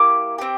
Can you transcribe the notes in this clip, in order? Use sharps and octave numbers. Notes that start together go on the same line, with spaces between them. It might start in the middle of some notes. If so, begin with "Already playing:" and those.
Already playing: A#3 E4 G4 A#5 D6
C4 G4